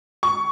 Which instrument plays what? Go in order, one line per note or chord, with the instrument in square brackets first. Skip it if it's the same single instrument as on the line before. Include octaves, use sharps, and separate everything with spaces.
[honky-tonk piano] C#6